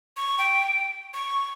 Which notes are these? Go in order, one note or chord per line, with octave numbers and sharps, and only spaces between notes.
C#6
G5
C#6